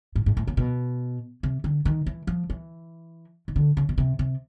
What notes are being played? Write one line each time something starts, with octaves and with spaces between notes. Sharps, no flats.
G#2
G#2
A2
A#2
B2
C3
D3
D#3
E3
F3
E3
D#3
D3
C#3
B2
C3
C3